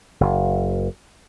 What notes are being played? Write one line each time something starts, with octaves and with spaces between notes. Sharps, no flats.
F#1